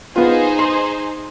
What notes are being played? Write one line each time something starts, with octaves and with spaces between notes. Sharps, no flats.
B3 D#4 F4 G#4 C5
C6